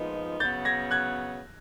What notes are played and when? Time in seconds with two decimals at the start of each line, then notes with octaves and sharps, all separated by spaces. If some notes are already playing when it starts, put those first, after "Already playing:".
Already playing: A#2 F3 G#3 B3 D#4
0.40 C#3 F#3 B3 G6 A6
0.65 G#6 A#6
0.91 F#6 G#6